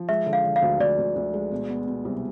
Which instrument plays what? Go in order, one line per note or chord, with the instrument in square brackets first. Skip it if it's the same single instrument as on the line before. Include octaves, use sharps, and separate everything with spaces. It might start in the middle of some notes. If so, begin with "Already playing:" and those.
Already playing: [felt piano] F3
[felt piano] G#3 [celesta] E5
[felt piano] D3
[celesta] F5
[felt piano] D3
[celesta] F5
[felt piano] D2
[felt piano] D2 [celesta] D5
[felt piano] D2
D2
G#3
B2
B3
B2
C2